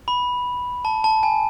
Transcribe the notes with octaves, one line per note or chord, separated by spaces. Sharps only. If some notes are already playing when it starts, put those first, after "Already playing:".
B5
A5
A5
G#5